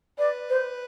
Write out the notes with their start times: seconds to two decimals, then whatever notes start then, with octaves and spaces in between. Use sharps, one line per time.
0.18 B4 D5
0.49 C5